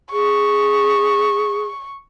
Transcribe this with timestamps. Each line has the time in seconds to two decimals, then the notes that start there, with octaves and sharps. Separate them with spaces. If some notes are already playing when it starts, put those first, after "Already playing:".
0.13 G#4 C#6